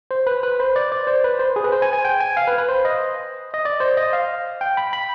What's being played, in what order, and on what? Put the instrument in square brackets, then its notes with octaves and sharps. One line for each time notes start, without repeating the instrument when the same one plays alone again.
[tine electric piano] C5
B4
B4
C5
D5
D5
C5
B4
C5
G#4
B4
C5
G#5
G#5
G5
G#5
F5
B4
B4
C5
D#5
D#5
D5
C5
D#5
F5
G5
B5
B5